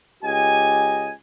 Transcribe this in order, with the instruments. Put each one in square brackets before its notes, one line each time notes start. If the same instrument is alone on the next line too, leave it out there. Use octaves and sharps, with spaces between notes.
[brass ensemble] C#2 G4 D#5 G#5